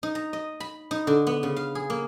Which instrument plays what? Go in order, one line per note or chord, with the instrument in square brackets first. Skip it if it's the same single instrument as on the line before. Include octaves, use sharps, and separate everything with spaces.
[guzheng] D#4
A#5
D#5
B5
D#4
D3
B3
C#3
F5
G#4
A#3